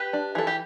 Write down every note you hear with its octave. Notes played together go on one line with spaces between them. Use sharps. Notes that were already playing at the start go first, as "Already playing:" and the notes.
Already playing: G4 B4
D4
E3 A4
G4